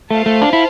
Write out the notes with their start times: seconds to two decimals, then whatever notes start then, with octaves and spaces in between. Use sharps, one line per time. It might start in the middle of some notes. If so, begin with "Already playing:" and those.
0.11 A3 F4 C5 F5 A5
0.26 A3
0.42 D4
0.53 E4